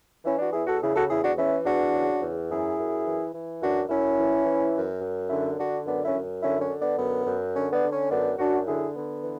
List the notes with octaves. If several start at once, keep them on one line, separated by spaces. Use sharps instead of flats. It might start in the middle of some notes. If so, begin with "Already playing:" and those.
E3 C#4 E4
D4 F#4
E2 E4 G#4
F#4 A4
C#3 E4 G#4
F#4 A4
E2 E4 G#4
D4 F#4
E3 C#4 E4
E2 D4 F#4
C#3
E2
F#2 E4 G#4
F#2
E3
E3
F#2 D4 F#4
F#2 C#4 E4
E3
E3
F#2
F#2
D3 C#4 E4
D3 D4 F#4
F#2 B3 D4
C#4 E4
F#2
D3 C#4 E4
C#4
D3
B3 D4
F#2 B3
F#2
D3 C#4
B3 D4
D3
C#4
F#2 B3 D4
F#2 D4 F#4
D3 E4 G#4
D3 B3
E3